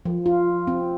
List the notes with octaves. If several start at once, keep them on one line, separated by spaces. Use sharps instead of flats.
F3
F4
C4